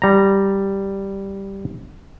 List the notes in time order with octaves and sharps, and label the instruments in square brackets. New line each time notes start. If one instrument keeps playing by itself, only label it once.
[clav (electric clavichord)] G3 A#5